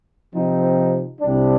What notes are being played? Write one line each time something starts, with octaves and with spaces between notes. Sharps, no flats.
C3 F3 C4 D#4
C2 C3 G3 D4